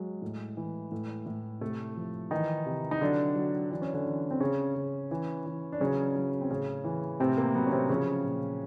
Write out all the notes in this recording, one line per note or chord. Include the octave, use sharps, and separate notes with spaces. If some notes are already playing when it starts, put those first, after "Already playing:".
Already playing: F#3 G#3
A2
E3
A2
A2
C3 A3 A4
F3
D#3 E3 D#4
C3
D#4
D3 F#3 D4
F#3
E3 D4
C#4
D3 D4
E3
C4
C#3 C#4
C#3
E3
E3
D4
C#3 F#3 C#4
F#3
C4
A2 C#3 C#4
E3
A2 C3 C4
A#3
F#3 B3
C#4
C3 C4
C#3 F3 C#4
A#2